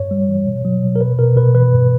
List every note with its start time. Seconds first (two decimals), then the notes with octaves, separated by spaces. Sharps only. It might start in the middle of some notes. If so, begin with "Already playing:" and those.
Already playing: G2 C#5
0.11 G3
0.29 E3
0.46 B2
0.65 F#3
0.83 B2
0.96 A#4
1.01 B2 B4
1.19 B2 A#4
1.36 B2 B4
1.55 E3 B4
1.73 G2